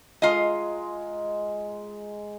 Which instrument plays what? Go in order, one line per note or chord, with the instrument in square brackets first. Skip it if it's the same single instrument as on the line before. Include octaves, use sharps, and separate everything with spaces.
[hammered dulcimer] G#3 A#5 [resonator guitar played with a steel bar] F4 D#5